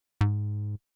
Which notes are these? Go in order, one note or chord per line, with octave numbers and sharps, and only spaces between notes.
G#2